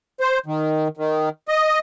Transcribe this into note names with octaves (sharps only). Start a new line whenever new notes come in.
C5
D#3
D#3
D#5